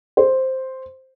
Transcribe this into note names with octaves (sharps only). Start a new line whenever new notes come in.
C5